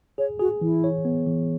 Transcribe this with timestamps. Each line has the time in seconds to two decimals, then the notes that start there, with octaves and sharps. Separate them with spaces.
0.18 G#4 C#5
0.39 F#4 G#4
0.61 E3 E4
0.84 C#5
1.05 B3
1.26 E3